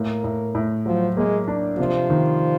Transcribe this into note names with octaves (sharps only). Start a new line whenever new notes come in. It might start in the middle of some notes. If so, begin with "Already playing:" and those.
Already playing: A2 A#3
A2
A2
F3 F#3
G#3 A#3
D4
C3 F3
D#3